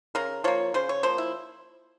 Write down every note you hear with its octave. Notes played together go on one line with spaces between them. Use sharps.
C#3 A#4
F3 A#3 C#5
C#3 C5
C#5
F3 A#3 C5
E4